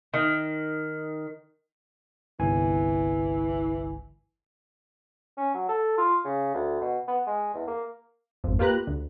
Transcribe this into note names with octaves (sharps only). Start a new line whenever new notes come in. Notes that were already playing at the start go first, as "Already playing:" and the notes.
D#3
G1 C2 E3 G#5
C#4
F#3
A4
F4
C#3
D2
B2
B3
G#3
E2
A#3
G#1 F2
A#3 F4 G4 B4 A#5 F#6
D2